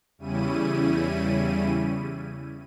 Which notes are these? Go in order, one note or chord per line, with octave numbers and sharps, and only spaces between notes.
E2 C#3 G3 C#4 E4 D#7